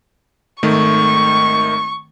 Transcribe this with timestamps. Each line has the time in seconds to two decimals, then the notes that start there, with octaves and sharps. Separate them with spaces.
0.63 G#1 D#3 A3 C#6